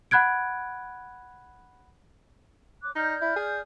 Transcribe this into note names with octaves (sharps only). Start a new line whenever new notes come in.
F#5 B5 F#6 G#6 D7
C#5 D6 F#6
D#4 D5 F6 G6
E4
G#4